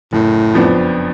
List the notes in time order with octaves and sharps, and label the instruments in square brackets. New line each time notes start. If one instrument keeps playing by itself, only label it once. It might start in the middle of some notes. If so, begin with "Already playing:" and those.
[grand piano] F#1 [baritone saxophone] A2
[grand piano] F2 F3 B3 D4